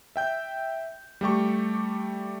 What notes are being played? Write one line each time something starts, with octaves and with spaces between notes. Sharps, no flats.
E5 G5 G6
G3 A3 G4 C#6